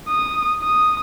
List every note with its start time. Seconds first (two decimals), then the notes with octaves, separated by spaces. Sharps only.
0.08 D#6
0.63 D#6